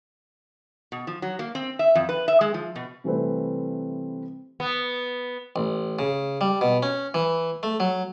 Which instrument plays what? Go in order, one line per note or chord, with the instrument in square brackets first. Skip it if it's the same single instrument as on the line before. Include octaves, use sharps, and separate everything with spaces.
[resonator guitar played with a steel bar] B2
F3
F#3
A#3
C4
E5
F2
B4
E5
G#3
F3
B2
[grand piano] C3 E3 G3 A3 C4 B4
[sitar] B3
[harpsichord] A1
C#3
G3
B2
C#4
E3
A3
F#3